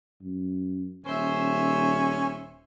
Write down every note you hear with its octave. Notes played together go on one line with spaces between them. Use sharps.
F#2
D#1 C#4 C5 E5